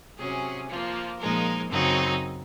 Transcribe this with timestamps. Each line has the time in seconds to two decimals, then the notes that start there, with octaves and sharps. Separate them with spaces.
0.18 C3 F#3 C#4 G#4
0.69 F3 A#3 F4
1.19 A#2 F3 G#3 D#4 A#4
1.70 F#2 C#3 F#3 C4 D#4